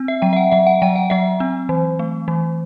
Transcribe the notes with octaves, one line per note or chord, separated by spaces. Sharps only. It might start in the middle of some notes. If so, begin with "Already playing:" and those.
Already playing: C4
E5
F#3 G5
E5
F#5
F#3 E5
F#5
F#3 G5
F#5
F#3 E5
C4
E3
A3
E3